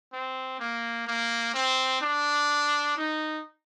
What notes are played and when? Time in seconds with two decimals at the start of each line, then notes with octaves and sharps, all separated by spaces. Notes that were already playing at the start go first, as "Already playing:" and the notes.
0.13 C4
0.60 A#3
1.07 A#3
1.54 C4
2.01 D4
2.97 D#4